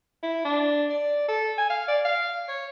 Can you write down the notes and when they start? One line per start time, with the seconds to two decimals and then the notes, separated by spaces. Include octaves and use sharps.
0.23 E4
0.45 D4
0.90 D5
1.28 A4
1.58 G#5
1.70 F5
1.88 D5
2.05 F5
2.48 C#5